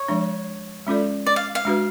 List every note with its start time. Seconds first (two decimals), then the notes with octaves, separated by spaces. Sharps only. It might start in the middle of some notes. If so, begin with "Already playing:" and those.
Already playing: C#5
0.08 F3 G#3 D4
0.87 G#3 C#4 F4 A4 D5
1.26 D5
1.36 F5
1.55 F5
1.65 G#3 D4 F#4 B4